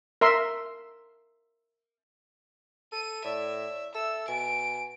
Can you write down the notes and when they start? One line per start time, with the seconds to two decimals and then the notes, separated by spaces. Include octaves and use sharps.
0.21 A#4 E5 C6
2.92 A4 D#7
3.24 A2 D5 E5
3.95 A4 E5 E6
4.28 B2 G#5 D7